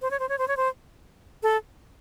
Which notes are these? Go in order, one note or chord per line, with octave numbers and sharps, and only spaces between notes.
C5
C#5
C5
C#5
C5
C#5
C5
A4